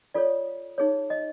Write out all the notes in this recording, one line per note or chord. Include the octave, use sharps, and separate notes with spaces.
F4 A4 C#5 D5
D#4 G#4 C#5
D#5